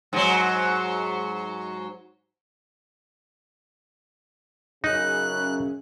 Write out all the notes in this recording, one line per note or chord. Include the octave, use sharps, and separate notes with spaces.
G#2 F#3
F#2 C#3 D#4 F#6
C#4